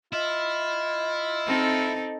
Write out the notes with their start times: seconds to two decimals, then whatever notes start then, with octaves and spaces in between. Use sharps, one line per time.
0.13 E4 F4 D#5
1.47 C4 D#4 A4